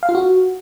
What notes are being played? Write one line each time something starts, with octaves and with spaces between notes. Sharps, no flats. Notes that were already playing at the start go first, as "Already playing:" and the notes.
F5
F4
F#4